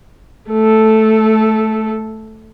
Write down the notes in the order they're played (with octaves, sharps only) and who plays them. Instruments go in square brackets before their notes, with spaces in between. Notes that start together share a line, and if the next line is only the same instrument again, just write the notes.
[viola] A3 A4